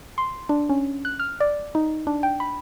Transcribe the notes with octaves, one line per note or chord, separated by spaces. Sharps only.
C6
D4
C#4
F#6
F6
D5
D#4
D4
G5
B5